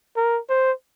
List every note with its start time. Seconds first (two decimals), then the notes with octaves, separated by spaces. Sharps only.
0.17 A#4
0.49 C5